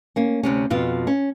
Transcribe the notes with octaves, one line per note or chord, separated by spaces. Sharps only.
A#3 C#4
D2 C3 C#4
F2 B2 F4
C#4